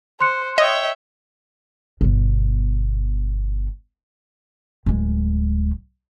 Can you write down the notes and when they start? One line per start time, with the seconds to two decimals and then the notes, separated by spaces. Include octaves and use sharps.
0.21 C5 C6 F#6 C#7
0.58 C#5 D#5 E5 G5
2.01 G1 B2
4.86 D1 G#3